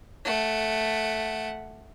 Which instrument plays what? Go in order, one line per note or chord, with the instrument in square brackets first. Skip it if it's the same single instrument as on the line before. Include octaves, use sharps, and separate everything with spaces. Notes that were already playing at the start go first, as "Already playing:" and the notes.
[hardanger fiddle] A3 F#5